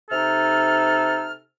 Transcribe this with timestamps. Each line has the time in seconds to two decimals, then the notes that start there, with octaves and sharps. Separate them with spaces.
0.10 C3 D#4 A4 F6